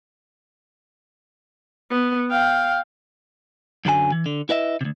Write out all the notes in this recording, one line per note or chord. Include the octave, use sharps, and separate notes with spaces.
B3
F5 G5
F#2 D3 F#3 A#4 G#5
E3
D3
E4 B4 D#5 E5
D2 C3